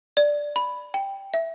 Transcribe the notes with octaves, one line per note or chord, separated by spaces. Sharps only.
D5
B5
G5
E5